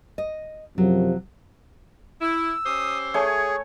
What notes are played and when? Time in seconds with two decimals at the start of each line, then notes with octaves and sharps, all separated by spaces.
0.18 D#5
0.78 F#2 C3 F3 F#3
2.21 E4 E6
2.66 C#4 G4 C5 D#6
3.14 A3 G#4 C#5 G#5